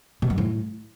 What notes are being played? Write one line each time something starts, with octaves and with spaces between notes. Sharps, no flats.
B2
F#2
A2